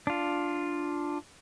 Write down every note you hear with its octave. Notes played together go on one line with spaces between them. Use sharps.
D4 F4